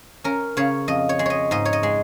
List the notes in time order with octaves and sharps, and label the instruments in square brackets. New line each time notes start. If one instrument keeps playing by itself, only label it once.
[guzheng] C#4 A#4
C#3 C#5
F2 D#5
C#5
G#3
C#5 D#5
G#2 D#5
C#5
D#5
G#3